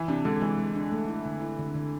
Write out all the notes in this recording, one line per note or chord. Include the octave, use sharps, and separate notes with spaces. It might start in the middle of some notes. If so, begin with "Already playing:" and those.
Already playing: E3
C3 D4
D3 G#3
E3 G#3
G#3
D4
A3
E4
D3
E4
D3
D3